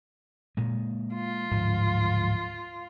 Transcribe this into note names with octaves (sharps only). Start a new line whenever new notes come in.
A#2 G#3
F4
D1 G#2 F3